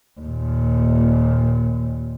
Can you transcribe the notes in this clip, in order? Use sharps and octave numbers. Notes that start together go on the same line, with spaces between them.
D#2 A#2